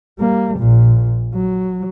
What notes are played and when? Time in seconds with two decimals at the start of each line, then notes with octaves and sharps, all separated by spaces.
0.19 G3 A#3
0.58 A#1 A#2
1.34 F#3